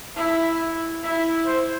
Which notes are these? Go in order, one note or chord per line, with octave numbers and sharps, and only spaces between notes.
E4 E5
E4 E5
C5